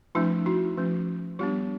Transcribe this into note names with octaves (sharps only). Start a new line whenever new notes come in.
F3 A3 C#4 D#4 F4
E4 F#4
F3 A3 C#4
G3 B3 D4 F4 G4